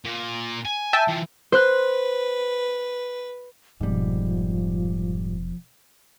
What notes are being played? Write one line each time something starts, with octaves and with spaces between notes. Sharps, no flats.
A#2
G#5
E5 G5 A5
E3 F4
B4 C5 F#6
F1 G#2 B2 F3 G3